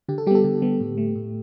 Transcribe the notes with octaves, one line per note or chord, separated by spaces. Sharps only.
D3 G4
A4
G3 B3 G4 A4
D3 G4
G3 B3
A2
A3
A2